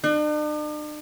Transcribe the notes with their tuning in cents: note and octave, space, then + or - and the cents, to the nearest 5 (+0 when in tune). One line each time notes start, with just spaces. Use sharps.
D4 +45